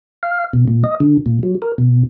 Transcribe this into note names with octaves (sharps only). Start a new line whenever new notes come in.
F5
B2
A#2
D#5
D3
A#2
F#3
A#4
B2